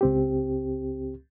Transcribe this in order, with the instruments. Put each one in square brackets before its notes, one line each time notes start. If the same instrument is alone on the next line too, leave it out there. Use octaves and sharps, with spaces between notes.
[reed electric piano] C#2 C4 G4